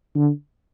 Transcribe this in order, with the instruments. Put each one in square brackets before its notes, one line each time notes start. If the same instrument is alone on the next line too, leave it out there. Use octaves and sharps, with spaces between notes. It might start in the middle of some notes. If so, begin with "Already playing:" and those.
[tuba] D3